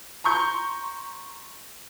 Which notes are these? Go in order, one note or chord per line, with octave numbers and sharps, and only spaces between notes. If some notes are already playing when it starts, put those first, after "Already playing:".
A#5 C6 C#6 G6